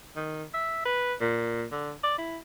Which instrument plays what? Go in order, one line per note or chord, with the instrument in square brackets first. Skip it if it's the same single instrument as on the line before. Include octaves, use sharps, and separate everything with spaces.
[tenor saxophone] D#3
E5
B4
A#2
D3
D5
E4